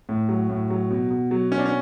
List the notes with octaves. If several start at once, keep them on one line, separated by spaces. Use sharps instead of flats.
A2
F#3
A2
F#3
B2
B2
F#3
B2 C#4
D4
C#4